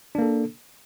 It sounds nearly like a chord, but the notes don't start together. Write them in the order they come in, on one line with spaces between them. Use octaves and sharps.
D4 A#3 A4